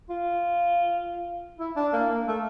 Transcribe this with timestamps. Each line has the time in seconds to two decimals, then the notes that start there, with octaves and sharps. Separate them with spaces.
0.09 F4
1.59 E4
1.76 D4
1.93 A#3
2.10 A#3
2.27 A3